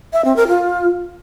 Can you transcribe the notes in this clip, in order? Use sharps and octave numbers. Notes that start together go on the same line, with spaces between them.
E5
C4
A#4
F4